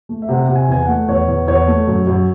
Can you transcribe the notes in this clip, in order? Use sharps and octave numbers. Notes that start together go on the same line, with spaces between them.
A3
E5
C3 F#5
C3 F#5
G#5
E2 G#5
F#5
A3
E2 C#5
E2
E2 C#5
A3
F#2
F#2